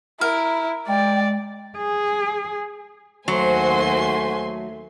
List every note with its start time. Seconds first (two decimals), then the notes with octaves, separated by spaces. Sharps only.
0.21 E4 A#4
0.88 G#3 D5 G5
1.77 G#4
3.28 D#2 F#3 A3 F#4 C5 G#5 C6